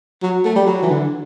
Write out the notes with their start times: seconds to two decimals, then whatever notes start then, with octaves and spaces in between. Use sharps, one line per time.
0.23 F#3
0.45 A3
0.56 G3
0.66 F#3
0.82 E3
0.89 D3